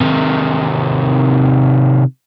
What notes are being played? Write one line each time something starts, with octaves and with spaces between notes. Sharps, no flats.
C3 D#3